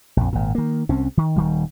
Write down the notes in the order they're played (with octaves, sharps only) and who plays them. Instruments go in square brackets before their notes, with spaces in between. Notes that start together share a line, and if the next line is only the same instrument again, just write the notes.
[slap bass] A#1 F2
G#1 A#2
D#3 A#3
C2 C4 C#4
D#3
D#1 D#3 G3